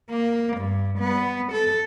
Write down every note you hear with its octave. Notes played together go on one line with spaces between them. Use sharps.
A#3
G2
B3
A4